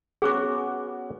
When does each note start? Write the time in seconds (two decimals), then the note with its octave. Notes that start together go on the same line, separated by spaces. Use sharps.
0.22 B3 C#4 F#4 G#4 D6